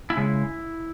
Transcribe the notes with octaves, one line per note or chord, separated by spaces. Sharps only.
E4
C#3 G#3